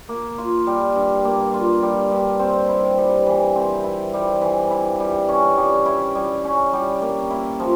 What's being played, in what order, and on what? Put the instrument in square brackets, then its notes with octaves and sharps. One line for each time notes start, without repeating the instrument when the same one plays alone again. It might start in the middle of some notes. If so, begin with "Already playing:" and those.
[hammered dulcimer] A#3
F4
G3
G2
A#3
F4
G3
G2
C4
E4
G3
E3
C4
E4
G3
E3
E4
G3
C#4
G3
E4
G3
C#4
G3
A#3
E4
F3